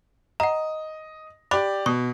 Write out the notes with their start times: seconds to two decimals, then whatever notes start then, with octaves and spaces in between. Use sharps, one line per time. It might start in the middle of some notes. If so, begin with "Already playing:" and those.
0.40 D#5 F#5 A#5
1.51 G4 D5 B5 D6 F#6
1.86 B2 C#6